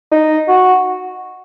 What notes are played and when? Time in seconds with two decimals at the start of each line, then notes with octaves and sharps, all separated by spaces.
0.12 D#4
0.48 F#4